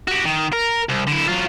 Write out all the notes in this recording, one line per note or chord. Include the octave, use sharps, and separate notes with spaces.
F#4 G4
D#3
A#4
C2
D3 E4
F#3 F4